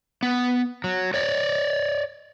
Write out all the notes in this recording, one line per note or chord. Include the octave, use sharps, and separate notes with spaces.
B3
F#3
C#5 D5